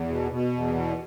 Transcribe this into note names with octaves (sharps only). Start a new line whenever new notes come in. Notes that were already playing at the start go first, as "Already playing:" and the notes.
Already playing: E2
B2
B2
E2
B2